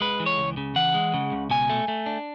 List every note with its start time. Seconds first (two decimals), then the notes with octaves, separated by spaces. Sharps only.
0.01 G#3 B4
0.20 E3
0.26 C#5
0.38 C#2
0.57 C#3
0.76 E3 F#5
0.94 G#3
1.14 C#3
1.32 C#2
1.50 B2 G#5
1.70 A3
1.88 A3
2.06 D4